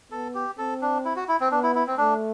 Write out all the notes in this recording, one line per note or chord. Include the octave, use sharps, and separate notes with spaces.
B3 A4
G4
C4 A4
D4
E4
F#4
E4
C4
B3 D4
E4
E4
C4
A3 D4